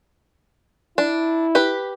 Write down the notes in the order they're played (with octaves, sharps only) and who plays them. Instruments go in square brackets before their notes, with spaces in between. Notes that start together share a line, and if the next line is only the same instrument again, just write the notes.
[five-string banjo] D4 [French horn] E4
[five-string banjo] G4 B4